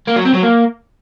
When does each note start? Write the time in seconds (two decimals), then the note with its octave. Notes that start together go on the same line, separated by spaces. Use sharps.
0.07 A#3
0.16 F#3
0.25 C4
0.34 F#3
0.42 A#3